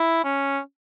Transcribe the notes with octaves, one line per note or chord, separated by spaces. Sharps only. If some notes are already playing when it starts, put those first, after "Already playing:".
Already playing: E4
C#4